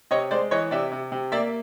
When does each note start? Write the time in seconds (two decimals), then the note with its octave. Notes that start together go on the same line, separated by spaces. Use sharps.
0.11 C3 C#5 D#5
0.31 G#3 C5 D5
0.51 E3 C#5 D#5
0.71 C3 D5 E5
0.92 C3
1.12 C3
1.32 A#3 D5 E5